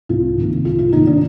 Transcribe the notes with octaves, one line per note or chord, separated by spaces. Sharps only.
C2 F4
C3 D#3 A#3
C2 F4
F4
C3 D#3 A#3 D#4
D4